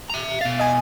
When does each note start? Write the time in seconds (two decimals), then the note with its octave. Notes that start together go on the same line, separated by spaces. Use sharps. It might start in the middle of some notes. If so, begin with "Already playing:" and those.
0.10 E5 A#5
0.41 B2 F5 A6
0.59 D#5 G#5